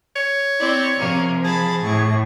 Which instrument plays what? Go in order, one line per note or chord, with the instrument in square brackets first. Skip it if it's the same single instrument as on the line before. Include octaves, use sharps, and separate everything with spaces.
[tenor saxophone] C#5
[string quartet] C4 E4 D5
[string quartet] C3 A#3 [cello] F3
[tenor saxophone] G#4 [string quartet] A5 B5
[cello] A2 [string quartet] C#6